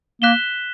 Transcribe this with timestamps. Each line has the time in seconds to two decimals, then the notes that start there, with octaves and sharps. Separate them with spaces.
0.22 A#3 F#6 B6 E7 G7